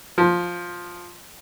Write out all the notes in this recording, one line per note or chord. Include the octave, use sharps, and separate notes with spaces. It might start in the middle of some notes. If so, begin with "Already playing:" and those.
F3